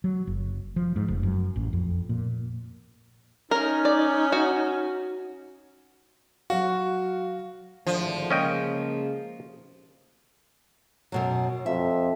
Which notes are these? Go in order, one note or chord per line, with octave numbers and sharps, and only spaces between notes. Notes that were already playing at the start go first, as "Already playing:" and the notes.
F#3
F#1
F3
G#2
F1
F#2
A1
F2
A#2
C#4 D#4 A#4
D5
F#4
F#3 F#4 F5
G#1 A2 D3 F3
C#3 G#3 A#3 C#4 D#5 G5
F#2 B2 F#3
F2 E5